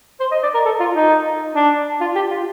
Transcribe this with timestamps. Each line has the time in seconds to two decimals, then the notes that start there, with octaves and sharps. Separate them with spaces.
0.20 C5
0.31 D#5
0.43 D5
0.54 A#4
0.65 A4
0.80 F4
0.96 D#4
1.55 D4
2.01 F4
2.15 G4
2.31 F4